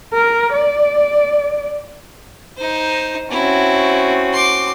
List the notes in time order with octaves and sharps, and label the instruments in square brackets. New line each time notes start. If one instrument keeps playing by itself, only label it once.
[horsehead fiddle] A#4
D5
[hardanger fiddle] D#4 C5
[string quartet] C4 C#4 F#4 [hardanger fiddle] E4
[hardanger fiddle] C6 D6